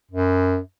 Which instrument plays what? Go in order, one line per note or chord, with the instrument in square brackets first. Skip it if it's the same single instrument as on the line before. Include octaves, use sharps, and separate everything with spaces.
[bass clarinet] F#2